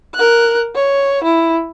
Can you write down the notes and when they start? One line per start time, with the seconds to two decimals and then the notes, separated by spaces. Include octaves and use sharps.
0.15 A#4 F#6
0.75 C#5
1.24 E4